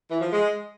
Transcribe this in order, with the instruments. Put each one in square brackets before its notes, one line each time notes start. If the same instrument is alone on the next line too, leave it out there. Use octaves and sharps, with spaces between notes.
[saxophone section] E3
F3
G#3